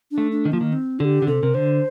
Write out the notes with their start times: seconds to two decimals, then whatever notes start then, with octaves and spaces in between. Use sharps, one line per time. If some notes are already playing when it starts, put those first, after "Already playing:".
0.11 D4
0.18 A3
0.32 D4
0.45 D#3
0.52 F3 A#3
0.61 D#3
0.73 C4
1.00 D3 G4 A4
1.22 D3
1.27 C3 A4
1.43 C3 A#4
1.54 D3 C5